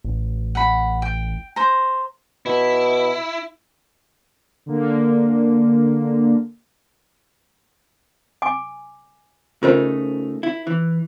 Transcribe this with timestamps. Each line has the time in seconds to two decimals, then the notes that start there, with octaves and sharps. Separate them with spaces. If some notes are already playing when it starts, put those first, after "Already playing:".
0.04 A1
0.55 F#5 B5
1.02 G5
1.56 C5 A#5
2.46 B2 E4
4.66 D3 A#3
8.42 G#5 D6
9.63 C#3 A3 D#4 F4 A#4 C5
10.43 E4
10.67 E3